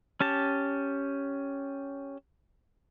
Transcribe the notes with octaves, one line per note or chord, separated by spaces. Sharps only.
C#4 G4 A5